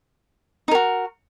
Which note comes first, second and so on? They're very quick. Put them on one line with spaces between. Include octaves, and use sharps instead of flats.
D#4 A#4 F#4